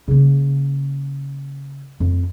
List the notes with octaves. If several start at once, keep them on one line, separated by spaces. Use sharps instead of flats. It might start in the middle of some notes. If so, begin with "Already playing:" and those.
C#3 A#3
F2